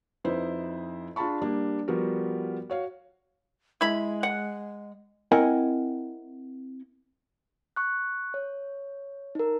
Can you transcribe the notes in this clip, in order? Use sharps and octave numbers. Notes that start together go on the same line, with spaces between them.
F2 D#4 E4 B4 C5
D4 F4 G#4 A5 B5 C#6
G3 A#3 D4
F3 G3 B3 F#4 A#4
F#4 C#5 F5
G#3 E4 B5
F#5
C4 E4 A#4 D#5 F#5 G#5
C#6 F#6
C#5
D#4 A#4